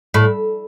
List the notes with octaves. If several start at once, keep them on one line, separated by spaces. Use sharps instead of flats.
A2